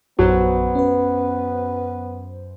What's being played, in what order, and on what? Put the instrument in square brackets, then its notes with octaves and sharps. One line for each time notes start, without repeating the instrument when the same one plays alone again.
[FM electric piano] A#1 [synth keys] F#2 C5 [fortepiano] F#3 [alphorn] B3
[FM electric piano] C#4 B4